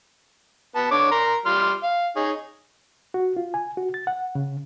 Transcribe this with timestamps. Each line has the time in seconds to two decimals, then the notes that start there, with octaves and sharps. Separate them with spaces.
0.75 B3 A5
0.91 D3 C#5 D6
1.11 A#4 A#5 C6
1.46 G3 C6 F6
1.83 F5
2.16 D#4 G#4 C#5
3.14 F#4
3.37 F4
3.54 G#5
3.77 F#4
3.94 A6
4.07 F#5
4.35 C#3